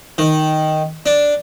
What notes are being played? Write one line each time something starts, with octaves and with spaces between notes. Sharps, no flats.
D#3
D4